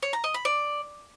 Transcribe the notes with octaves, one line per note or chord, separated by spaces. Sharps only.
C#5
A#5
D#5
B5
D5